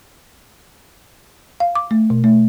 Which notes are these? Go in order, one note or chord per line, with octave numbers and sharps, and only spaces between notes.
F5
D6
A3
B2
A3